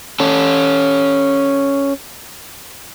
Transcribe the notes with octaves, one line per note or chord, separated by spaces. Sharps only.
C#4 A4